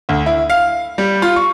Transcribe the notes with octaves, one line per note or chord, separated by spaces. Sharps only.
D2
E4
F5
G3
F4
C#6